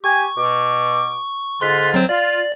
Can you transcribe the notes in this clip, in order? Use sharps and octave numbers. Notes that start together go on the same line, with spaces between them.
G4 G#5 C#6
B2 D6
G#2 D3 F4 C6 F#6 B6
F#3 C4 C5
F4 D5